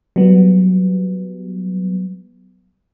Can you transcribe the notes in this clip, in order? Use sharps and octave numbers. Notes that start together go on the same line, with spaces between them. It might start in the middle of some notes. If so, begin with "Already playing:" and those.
F#3 G3 B3